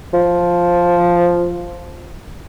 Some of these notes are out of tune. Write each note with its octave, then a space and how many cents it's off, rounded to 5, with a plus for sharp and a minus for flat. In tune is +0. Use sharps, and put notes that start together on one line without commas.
F3 +0